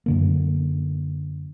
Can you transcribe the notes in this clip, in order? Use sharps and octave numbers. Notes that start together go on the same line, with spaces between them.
F#2 D3 A#3